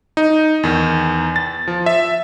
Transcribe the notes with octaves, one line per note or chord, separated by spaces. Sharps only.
D#4
E2 D#3
A6
F3
E5